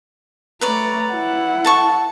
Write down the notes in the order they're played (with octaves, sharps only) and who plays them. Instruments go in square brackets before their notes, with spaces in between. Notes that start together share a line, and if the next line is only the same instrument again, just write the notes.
[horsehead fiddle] A3 A#5 [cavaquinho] B4 C#5 D5
[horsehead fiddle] E4 F#5
[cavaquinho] A4 A5 C#6